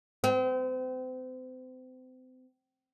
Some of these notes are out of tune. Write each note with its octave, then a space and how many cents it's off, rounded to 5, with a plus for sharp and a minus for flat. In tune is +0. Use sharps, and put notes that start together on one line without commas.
C4 -35